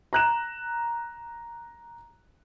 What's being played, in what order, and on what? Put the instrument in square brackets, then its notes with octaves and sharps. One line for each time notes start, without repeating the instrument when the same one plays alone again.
[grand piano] A#5 F#6 E7